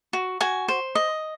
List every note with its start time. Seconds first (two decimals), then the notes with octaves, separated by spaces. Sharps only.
0.13 F#4
0.41 F#4 G#5
0.68 C5
0.95 D#5